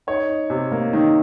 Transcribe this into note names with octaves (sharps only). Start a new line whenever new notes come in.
D#4 C#5
D#4
C3
A#3
D#3